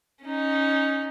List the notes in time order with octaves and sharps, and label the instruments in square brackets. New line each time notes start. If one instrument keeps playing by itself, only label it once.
[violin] C#4 D#4